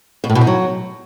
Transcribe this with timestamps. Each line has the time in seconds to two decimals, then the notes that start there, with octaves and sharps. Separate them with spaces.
0.24 B2
0.30 A2
0.35 B2
0.41 D#4
0.47 F#3